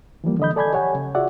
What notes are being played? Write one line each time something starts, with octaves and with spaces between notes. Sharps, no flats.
E3 F3 G3 A#3
D3 E3 D#5 B5 G6
A4 D5 G#5 B5 G6 G#6
G4 C#5 F#5 G#5
C#3
F4 F#4 G#4 D5 E5 F#5